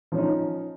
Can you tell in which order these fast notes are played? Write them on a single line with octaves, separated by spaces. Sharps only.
F3 C#4 D#4